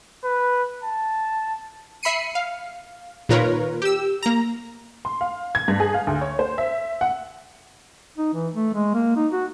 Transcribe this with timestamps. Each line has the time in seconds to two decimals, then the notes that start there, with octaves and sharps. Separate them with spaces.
0.24 B4
0.83 A5
2.03 E5 B5 C7 C#7 D#7
2.35 F5
3.29 A#2 D#3 F4 A#4 B4 C#5
3.82 G4 E6
4.23 A#3 A#5
5.05 C6
5.21 F5
5.55 G#6
5.68 G2
5.80 G#4
5.94 F5
6.07 D2
6.21 C#5
6.39 C5
6.58 E5
7.01 F#5
8.18 D#4
8.34 E3
8.54 A3
8.74 G#3
8.94 A#3
9.16 D#4
9.32 F#4